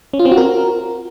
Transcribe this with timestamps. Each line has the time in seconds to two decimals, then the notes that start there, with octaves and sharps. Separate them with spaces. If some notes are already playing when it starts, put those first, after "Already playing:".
0.13 C#4
0.19 F4
0.25 C4
0.31 F#4
0.37 A#4